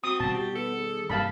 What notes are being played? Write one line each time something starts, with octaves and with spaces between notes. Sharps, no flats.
C4 F#4 D#6
B2 D#3 G3 A5
G4
B3 A4
G#4
G2 C3 E3 G3 A#3 F5 A5 B5